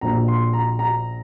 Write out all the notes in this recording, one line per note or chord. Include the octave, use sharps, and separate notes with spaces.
A#1 A#2 F3 A#5
C6
A#5
A#5